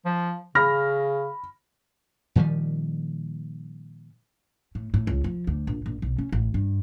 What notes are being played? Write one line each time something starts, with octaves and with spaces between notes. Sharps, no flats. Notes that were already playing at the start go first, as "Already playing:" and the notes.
F3
C#3 B5 F6 A#6
A#2 D#3 F3 G3
A2
A2
C#2
F3
D2
A#1
A#1
B1
C#4
A1
G2